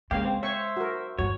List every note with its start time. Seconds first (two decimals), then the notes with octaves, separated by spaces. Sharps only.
0.11 C#3 G#3 A#3 G4 F5
0.25 C4
0.43 C5 C#5 E5 C#6
0.77 F#4 A#4
1.19 G2 D#3 F#4 C#5